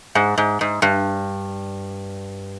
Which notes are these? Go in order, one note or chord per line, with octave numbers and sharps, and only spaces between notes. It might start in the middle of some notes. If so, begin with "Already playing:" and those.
G#2
G#2
G#2
G2